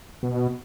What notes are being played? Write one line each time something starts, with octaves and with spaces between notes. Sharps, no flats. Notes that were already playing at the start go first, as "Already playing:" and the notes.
B2